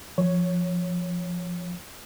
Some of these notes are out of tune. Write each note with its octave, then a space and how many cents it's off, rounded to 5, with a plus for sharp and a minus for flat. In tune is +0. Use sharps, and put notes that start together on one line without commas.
F3 +0 C#5 +0